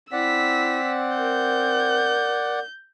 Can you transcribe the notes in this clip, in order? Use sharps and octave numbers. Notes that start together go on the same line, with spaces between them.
C4 E4 D5 F#5 E6 B6
A#4 G6